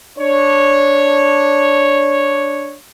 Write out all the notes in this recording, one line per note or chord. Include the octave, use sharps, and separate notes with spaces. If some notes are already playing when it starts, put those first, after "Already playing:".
D4 C#5